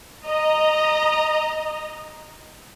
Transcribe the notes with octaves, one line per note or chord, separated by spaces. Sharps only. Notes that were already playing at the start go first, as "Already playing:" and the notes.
D#5 A#5